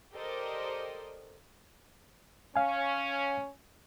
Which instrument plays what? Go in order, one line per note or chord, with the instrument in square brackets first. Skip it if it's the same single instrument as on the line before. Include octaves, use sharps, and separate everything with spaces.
[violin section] G4 A4 A#4 C5 D5 D#5
[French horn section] C#4 [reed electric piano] F5 G#5